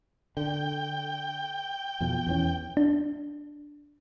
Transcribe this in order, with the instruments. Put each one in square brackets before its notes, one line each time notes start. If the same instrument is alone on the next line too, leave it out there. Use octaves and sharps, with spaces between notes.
[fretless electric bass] D3 [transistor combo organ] G5
[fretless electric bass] F2 B2 F3
E2 E3 C#4
[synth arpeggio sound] D4